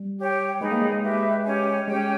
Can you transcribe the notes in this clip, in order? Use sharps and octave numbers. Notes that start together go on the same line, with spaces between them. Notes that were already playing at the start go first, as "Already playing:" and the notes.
Already playing: G3
G4 C#5 G5
G#3 D#4 G#4 B4
A#3
G#3
G#3
G4 B4 E5
C#4 G4 C#5 G#5
G#3 C#4 G4 C#5 G5